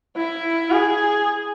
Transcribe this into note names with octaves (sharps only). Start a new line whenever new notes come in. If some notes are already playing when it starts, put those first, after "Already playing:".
E4
G#4